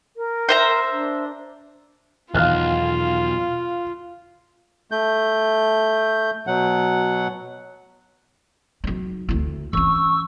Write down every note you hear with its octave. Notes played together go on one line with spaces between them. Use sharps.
A#4
C5 E5 A#5
D4
B1 E2 D#3 F4 F5 F6 F#6
A3 G6
B2 F#3 F#5
F#3 D#4
D2 E4
E3 C#4 C#6 E6